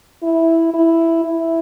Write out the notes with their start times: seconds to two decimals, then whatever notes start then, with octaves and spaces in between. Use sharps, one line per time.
0.23 E4
0.74 E4
1.25 E4